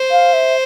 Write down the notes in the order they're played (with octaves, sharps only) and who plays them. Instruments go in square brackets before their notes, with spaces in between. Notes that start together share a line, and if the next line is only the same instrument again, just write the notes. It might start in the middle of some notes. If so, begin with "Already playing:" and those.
Already playing: [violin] C5
[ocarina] F5
E5